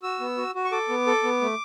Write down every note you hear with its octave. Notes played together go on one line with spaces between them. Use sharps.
F#4 E6
B3
F#4
F#4
C#6
A4 D6
B3
A4
B3
A3